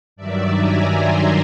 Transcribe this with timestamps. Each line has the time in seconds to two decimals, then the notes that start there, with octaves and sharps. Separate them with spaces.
0.16 G2 D#3 F#3 D5 E5
0.57 G#5 A#5
0.96 A#5 C6